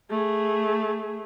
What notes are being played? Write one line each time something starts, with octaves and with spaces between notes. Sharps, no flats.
A3 G#4